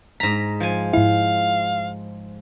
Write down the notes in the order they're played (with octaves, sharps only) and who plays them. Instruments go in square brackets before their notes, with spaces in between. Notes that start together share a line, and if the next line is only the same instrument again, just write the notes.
[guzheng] G#2 A#5 [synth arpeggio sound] B6
[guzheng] F3 G#5
[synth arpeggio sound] G#2 E4 [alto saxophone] F5